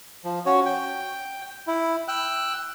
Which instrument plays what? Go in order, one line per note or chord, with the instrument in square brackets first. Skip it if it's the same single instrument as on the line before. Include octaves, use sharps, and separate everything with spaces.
[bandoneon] F3
C#4 F#4 C#5
G5
E4
G5 E6 F#6